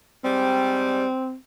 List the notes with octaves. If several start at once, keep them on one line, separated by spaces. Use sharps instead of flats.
G#2 G3 C4